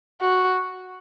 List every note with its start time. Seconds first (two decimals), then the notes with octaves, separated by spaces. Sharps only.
0.21 F#4